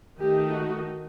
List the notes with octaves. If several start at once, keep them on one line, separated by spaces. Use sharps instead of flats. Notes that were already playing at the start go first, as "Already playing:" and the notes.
D#3 A3 D#4 G4
F#4